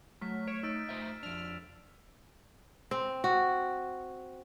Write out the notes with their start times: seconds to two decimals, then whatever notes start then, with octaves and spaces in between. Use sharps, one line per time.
0.21 F#3 A3 F6 B6
0.48 C#5 D7 E7
0.63 D#4 E6 A6 D7
0.89 A3 C5 E5
1.23 F2 D4 F6 D7 E7 F7
2.91 C4
3.24 F#4